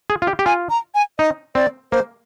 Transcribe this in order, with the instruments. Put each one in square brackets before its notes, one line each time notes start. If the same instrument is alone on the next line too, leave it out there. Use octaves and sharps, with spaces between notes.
[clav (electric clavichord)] G#4
F4
G4
G4
[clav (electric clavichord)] F4 [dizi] G#5
[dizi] A#5
G#5
[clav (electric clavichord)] D#4 [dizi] D#5
[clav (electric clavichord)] C4 [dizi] D5
[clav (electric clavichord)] A#3 [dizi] C5